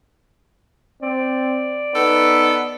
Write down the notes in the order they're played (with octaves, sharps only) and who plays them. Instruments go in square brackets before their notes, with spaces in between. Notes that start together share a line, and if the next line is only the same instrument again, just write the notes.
[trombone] C4 [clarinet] D5
[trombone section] B3 [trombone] D#4 [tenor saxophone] A4